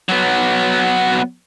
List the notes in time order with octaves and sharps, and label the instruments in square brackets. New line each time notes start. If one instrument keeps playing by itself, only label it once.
[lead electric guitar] F#3 B3